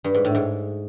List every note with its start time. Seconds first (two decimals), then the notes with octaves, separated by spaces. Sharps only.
0.04 G2
0.15 G#2
0.25 A2
0.35 G#2